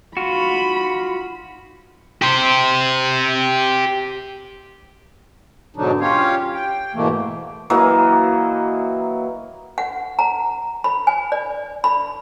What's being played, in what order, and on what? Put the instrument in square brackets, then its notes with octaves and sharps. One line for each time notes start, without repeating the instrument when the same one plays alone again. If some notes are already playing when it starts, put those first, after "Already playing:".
[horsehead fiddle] D#4 B5 [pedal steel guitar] F4 F#4
[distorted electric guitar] G4 C5
[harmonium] G#2 B2 D3 F#3 D4 D#4
C#4 F4 G4 C#5 F5
G5
G#2 B2 E3 A3 A#3
[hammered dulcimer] E3 F#3 A#3 D#5
[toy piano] F#5
A#5
B5
G#5
D5
B5